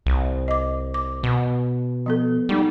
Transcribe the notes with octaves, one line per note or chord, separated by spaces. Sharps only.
C2
D#5 D6
D6
B2
F3 B3 A4
G3 G#3 D#4